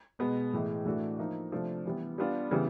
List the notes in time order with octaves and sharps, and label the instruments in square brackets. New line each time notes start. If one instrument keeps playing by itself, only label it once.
[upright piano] B2 G#3 B3
A2 E3 G#3
A2 E3 A3 D4 F#4
F3 A#3 D#4
C3 F3 A3 D4
E3 G3 B3
G3 B3 D4 F4
C#3 E3 G3 B3